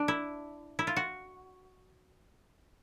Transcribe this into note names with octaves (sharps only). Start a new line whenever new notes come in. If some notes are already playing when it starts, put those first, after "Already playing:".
Already playing: D4
E4
E4
F4
F#4